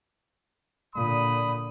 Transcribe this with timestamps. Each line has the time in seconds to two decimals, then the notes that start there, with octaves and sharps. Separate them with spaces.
0.95 A#2 D3 B5 D#6